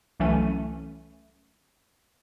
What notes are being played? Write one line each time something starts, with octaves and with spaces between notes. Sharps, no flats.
C2 E3 F#3 A3 C#4 D#7